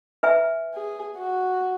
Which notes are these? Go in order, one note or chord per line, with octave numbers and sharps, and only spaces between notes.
B4 E5 G#5
G#4
F#4